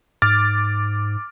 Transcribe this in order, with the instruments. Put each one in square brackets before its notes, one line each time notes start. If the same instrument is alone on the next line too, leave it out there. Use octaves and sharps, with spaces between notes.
[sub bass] G#2 [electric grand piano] D6 F6 A6